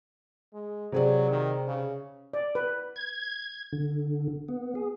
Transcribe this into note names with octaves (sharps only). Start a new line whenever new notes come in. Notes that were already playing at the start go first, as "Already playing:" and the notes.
G#3
C3 F#3 G#4 D5
D#3
C#3
D5
B4
G#6
D3
B3
G#4